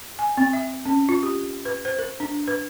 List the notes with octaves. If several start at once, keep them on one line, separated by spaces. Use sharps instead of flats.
G#5
C4
E5
C#4
F4
G4
B4
C5
A#4
D4
B4